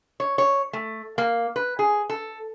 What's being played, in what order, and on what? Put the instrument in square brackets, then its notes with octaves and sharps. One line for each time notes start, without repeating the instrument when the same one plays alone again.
[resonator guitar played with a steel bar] C#5
C#5
A3
A#3
B4
G#4
A4